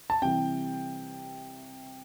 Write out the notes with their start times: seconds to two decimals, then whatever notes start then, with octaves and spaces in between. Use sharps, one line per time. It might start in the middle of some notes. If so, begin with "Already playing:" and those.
0.10 A5
0.22 C3 E3 G3 G5